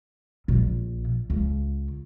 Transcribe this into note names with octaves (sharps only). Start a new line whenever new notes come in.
A#1
C#2